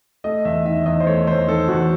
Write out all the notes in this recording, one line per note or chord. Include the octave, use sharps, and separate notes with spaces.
A3 D#5
E2 E5
D#3 E5
E2 D#5
C5
A3 C#5
E2 C5
D#3 A4
E2 F#4